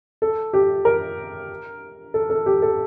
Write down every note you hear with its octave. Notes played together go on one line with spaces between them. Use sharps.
A4
G4
A#4
A4
A4
G4
A4